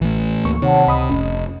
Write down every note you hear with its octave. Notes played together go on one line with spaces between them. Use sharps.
A1 A2 E3
D2 A#3 C#6
C3 D#3 C#5 F#5 A5
C#2 D#5 B5 D#6
F1 C#4